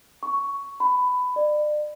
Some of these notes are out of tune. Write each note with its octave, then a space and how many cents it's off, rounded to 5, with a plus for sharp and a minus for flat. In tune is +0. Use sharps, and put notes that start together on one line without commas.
C#6 +10
B5 +15
D5 +35